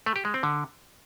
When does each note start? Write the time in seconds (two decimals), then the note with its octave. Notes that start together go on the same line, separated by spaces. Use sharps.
0.06 A3
0.16 G4
0.25 G#3
0.34 C4
0.43 D3